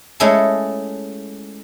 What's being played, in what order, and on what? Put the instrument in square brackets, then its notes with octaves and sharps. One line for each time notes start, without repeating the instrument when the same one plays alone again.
[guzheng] G#3 A3 C#4 E4 G#4 A4